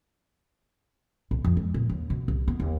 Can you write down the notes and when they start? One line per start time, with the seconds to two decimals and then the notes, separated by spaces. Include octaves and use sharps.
1.31 B1
1.45 F2
1.57 G#3
1.74 A#2
1.90 D#2
2.10 B2
2.28 C2
2.48 B3
2.60 D#2